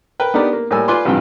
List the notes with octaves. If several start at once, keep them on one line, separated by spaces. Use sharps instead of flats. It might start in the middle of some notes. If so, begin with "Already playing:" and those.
A#4 B4 G5
B3 D4 D#4 G4 A#4 D5
A#3
A2 G3 A#3 G#5 E6
F4 B4 D5 G#5 C6 D6
A1 G2 C3 F3 G5